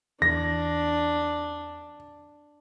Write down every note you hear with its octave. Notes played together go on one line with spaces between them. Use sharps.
E2 E3 D4 A#6